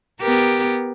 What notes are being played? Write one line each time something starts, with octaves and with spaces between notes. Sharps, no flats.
B3 G4 A#4